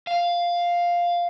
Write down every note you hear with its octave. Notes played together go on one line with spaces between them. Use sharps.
F5